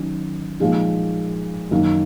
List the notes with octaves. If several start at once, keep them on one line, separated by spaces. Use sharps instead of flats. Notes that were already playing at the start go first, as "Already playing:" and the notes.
Already playing: D#3 F#3 C#4
A#2 F3 G#3 D#4
F#2 D#3 A#3 D#4